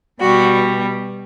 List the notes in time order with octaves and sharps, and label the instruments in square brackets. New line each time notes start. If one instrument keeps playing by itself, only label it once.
[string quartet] B2 G3 F#4